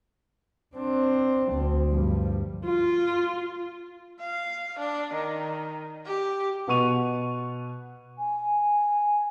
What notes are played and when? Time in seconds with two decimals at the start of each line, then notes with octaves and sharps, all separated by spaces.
0.75 C4 D4
1.53 D2
1.88 G2 F3
2.65 F4
4.21 F5
4.79 D4
5.14 D#3
6.06 G4
6.68 B2 B3 F#5 C#6 D#7 F7
8.18 G#5